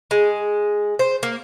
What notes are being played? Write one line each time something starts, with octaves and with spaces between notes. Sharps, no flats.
G#3
C5
A#3